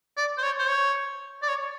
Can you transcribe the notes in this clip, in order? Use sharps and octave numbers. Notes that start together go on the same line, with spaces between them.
D5
C5
C#5
C5
C#5
D5
C#5